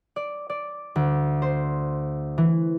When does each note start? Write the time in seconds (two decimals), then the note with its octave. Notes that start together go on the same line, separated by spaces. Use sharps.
0.16 D5
0.50 D5
0.96 D2
1.42 C5
2.38 E3